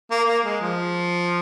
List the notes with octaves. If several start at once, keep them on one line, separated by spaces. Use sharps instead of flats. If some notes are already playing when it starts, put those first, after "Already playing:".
A#3
A#3
G#3
F3